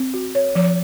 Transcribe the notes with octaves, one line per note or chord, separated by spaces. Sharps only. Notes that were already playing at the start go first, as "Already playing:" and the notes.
Already playing: C4
F#4
C#5
F3